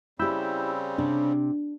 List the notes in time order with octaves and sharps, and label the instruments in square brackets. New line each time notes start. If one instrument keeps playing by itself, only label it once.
[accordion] C#3 G3 C4 [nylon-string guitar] E4 G4 [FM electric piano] B5 E6 G6
[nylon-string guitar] C3 [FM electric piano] D4